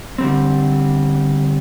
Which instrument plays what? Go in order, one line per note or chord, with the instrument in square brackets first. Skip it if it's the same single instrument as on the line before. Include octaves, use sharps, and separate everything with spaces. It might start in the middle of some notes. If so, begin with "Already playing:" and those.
[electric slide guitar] D3 G3 C4